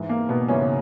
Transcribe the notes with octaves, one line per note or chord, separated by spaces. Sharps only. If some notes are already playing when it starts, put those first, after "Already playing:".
Already playing: G#2 E3
A#3
B2 B3
G#2 C#3 E3 C#4